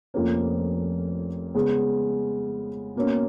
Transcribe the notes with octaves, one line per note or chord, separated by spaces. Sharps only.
F1 F2 F3 A#3 C#4
C#3 G#3 B3
B2 A#3 C#4